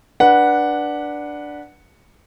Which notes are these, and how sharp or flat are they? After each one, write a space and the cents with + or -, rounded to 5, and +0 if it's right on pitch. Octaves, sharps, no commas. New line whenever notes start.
D4 +0 B4 -20 F#5 +0